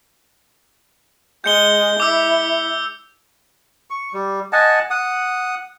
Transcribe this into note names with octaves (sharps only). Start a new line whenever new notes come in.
G#3 G6 C#7 G7
E4 D6 E6
C#6
G3
D#5 F#5 G#5 A5
F#5 D#6